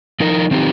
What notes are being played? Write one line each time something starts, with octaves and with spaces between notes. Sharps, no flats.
F3 D#4 A#4
D#3 C4 D#4 G4